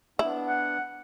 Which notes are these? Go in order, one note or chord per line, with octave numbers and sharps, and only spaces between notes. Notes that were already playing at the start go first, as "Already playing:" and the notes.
B3 D4 E4
F#5